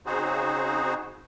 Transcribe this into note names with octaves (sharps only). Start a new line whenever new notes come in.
C#3 C4 D#4 F#4 G#4 C5